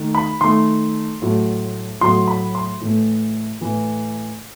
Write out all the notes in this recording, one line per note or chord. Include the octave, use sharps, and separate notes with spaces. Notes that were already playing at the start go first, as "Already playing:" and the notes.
Already playing: D#3 A3
B5
D#3 A3 C6
A2 F#3 A3
A2 F#3 A3 C6
B5
C6
A2 E3 A3
A2 E3 A3